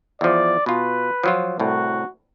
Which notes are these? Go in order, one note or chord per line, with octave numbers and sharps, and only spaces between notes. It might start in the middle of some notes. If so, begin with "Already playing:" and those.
E2 F3 D5
B2 F4 B4
F3 F#3 F4
C2 A2 F#4